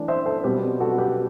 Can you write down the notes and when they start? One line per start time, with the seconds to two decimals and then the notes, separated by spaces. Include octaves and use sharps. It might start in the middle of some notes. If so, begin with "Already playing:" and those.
Already playing: E3 A3 D4
0.08 C5 E5
0.26 A4 C5
0.44 B2 G3 C4 G4 B4
0.80 F#4 A4
0.98 G4 B4